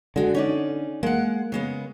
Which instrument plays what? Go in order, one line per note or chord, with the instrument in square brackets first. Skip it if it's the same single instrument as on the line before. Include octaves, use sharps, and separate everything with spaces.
[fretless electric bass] D3 [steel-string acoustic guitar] G#3 F#4
[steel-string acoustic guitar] C#4 D#4 D5
[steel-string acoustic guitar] G#3 F#5 [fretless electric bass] A#3
[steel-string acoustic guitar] C#3 G#3 B3